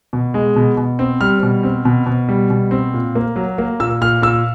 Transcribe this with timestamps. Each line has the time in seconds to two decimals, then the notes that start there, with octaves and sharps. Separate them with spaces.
0.13 B2
0.34 G#3
0.56 B2
0.77 B2
0.99 C4
1.20 G3 F6
1.43 B2
1.63 C4
1.85 B2
2.06 B2
2.29 G3
2.50 B2
2.71 C4
2.94 A#2
3.15 A#3
3.36 F#3
3.58 A#3
3.80 A#2 E6
4.01 A#2 F6
4.22 A#2 E6